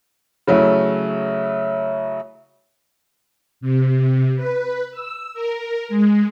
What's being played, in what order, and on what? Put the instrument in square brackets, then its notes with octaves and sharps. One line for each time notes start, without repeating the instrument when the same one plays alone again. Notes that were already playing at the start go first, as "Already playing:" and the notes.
[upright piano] C#3 F#3 A3 E4
[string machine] C3
B4
E6
A#4
G#3